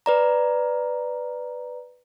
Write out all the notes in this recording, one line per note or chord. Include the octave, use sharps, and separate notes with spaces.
B4 D5 A#5